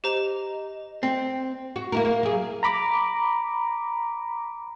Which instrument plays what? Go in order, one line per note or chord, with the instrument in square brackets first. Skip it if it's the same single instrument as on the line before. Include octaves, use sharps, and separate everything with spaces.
[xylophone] G4 C5 A#5 [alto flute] D#5
[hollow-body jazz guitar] C4 [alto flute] G5
[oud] F#4
A#3 E4 A#4
A#3
F#3 G#4
[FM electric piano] A#5 B5 D6